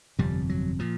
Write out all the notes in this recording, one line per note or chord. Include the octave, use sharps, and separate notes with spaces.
G1 F2 C3 G3
F#3
A#2 F3